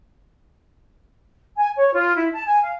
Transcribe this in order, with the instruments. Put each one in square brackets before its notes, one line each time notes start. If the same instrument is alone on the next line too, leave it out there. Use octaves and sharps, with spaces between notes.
[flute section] G#5
C#5
F4
E4
A5
G#5
F5